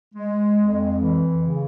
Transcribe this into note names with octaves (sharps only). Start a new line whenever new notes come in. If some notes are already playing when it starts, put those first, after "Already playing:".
G#3
F2
E3
C#3